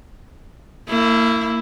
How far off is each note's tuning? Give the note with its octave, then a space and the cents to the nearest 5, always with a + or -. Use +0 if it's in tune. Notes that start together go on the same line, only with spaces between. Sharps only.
A#3 -35 E4 +0